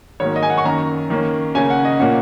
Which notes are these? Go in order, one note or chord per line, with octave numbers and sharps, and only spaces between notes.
G#2 D#3 F#3 A#3 C#5
D#5
G#5
F#5
C#6
F#2 D#3 A#3 A#5
D#3 A#3 C#4
C#3 A#3 C#4 G#5
F#5
D#5
A#2 A#3 C#4 F#5